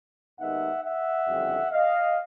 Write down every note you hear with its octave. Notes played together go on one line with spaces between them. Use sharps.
D#2 D#3 G#3 B3 D#4 E5 F#5
E5 F#5
F#1 F2 D3 G3 C4
D#5 F5